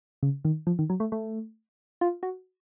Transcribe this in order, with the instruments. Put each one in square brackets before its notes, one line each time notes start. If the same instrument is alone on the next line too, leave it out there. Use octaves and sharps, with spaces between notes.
[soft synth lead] C#3
D#3
F3
D#3
F#3
A3
A3
F4
F#4